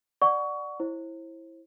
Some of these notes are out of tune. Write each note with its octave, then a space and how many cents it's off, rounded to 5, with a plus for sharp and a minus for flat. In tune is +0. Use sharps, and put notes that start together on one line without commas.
D5 +10 F#5 +0 C#6 +25
E4 +0 C5 +35